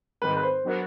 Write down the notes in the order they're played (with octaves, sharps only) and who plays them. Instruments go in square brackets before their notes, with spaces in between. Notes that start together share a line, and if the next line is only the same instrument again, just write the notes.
[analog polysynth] G#2 D#3 G3 C4 [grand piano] B4
[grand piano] B4
C5
[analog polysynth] F#3 B3 D4 F#4 A#4